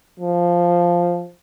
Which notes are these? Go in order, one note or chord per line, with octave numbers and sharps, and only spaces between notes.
F3